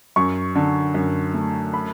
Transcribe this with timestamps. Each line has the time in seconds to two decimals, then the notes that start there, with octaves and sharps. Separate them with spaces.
0.16 F#2 C#6
0.55 D3
0.94 F#2
1.34 A3
1.74 B5